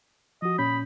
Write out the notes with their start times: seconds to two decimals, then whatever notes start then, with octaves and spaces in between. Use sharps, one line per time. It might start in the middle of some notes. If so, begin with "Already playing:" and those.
0.42 F3 F#4 D#5
0.59 A#2 C#4 B5 G6